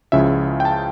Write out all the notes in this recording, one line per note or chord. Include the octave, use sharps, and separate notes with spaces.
C#2 C#3 F3 C#4 E4 E5
G5
A5